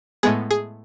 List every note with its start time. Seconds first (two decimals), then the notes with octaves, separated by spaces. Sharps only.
0.23 A2 G#3 B3 G#4
0.51 G#4